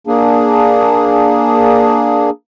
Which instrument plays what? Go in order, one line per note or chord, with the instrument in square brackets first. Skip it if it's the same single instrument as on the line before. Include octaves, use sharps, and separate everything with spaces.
[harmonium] A#3 D4 G#4